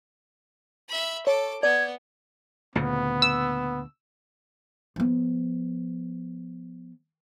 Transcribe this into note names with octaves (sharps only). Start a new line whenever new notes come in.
E5 B5
A4 C#5 D6
B3 D5 G#6
D2 A#2 C#3 B3
E6
F3 B3